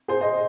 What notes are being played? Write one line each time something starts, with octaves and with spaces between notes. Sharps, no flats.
G#4 C5
C5 D#5